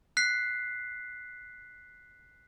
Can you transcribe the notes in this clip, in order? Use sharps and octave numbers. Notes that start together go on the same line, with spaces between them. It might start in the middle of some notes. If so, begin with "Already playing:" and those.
F#6 B6 C7